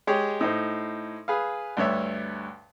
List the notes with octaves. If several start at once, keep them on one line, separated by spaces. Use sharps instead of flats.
G#3 G4 G#4 C#5
A2 D#4 C5
G#4 B4 F5
D2 G2 C#5 E5